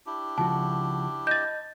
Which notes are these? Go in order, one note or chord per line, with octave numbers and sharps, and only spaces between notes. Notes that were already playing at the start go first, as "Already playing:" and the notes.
D4 E4 G4
C#2 F3 F#4 A5
D#5 G6 A6